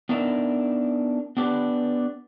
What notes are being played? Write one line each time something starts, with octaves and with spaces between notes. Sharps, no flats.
B3 D4 D#4 A#4 E5
B3 D4 G4 B4